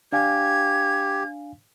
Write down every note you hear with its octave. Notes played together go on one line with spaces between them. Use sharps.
D4 G4 F5 G#5 G#6